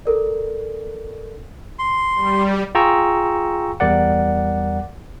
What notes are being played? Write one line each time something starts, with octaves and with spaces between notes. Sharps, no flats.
A4 A#4 D5
C6
G3
F4 G#4 G5 A#5 C#6 E6
E2 G3 A#4 D5 F#5